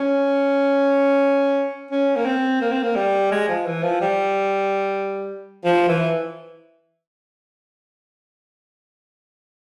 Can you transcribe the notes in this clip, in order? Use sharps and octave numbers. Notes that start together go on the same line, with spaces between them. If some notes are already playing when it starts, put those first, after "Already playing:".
Already playing: C#4
C#4
A#3
C4
A#3
C4
A#3
G3
G#3
F3
E3
F3
G3
F3
E3